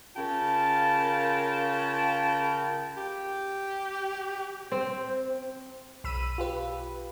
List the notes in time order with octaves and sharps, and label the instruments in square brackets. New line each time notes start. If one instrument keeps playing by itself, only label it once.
[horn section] C#3 F4 A#4 G5 A5
[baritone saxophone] G4
[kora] C4 [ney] C5
[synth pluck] B1 B5 E6 D#7
F4 G4 B4